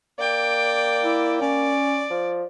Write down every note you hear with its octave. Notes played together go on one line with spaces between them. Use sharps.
A#3 D5 G5
E4
C#4 D5
F3